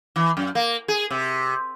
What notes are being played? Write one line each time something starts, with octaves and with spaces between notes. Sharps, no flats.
E3
F#2
A#3
G#4
C3